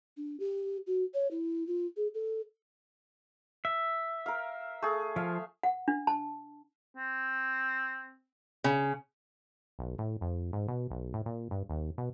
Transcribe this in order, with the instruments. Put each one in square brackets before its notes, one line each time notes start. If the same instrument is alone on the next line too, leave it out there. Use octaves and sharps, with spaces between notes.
[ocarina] D4
G4
F#4
C#5
E4
F4
G#4
A4
[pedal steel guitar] E5
[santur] A#4 F5
A3 G#4
[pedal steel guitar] F3 [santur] E5 F5
[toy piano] F#5
D4
A5
[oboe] C4
[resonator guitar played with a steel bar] C#3
[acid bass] B1
A2
F2
G#2
B2
B1
A2
A#2
G2
D#2
B2